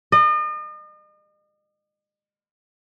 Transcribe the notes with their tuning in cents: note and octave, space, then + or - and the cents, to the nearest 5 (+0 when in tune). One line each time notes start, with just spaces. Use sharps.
D#5 -40